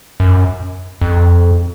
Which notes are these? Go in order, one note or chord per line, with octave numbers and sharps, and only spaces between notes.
F#2
F2